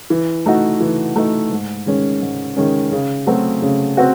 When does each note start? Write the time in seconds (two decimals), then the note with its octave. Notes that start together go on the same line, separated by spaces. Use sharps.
0.10 E3
0.46 A3 D#4 F#4
0.81 E3
1.16 A3 D#4 F#4
1.51 G#2
1.86 D#3 G#3 C#4
2.22 G#2
2.57 D#3 G#3 C#4
2.92 C#3
3.27 F#3 A3 C4 F#4
3.62 C#3
3.97 C4 F#4